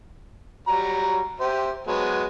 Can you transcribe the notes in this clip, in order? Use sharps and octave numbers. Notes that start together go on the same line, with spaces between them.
F#3 G3 A#5
G4 C5 E5
F#3 G#3 B3